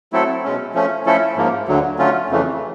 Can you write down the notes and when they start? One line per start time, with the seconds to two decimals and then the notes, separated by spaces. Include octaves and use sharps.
0.13 F#3 A3 C4 E4 A4
0.44 B2 G#3 C#4
0.74 F3 A3 C#4
1.05 F3 A3 C#4 E4 A4
1.37 G#2 F3 A#3
1.68 D2 D3 F#3
1.99 D3 F#3 A3 C#4 F4
2.30 F2 C#3 E3 A3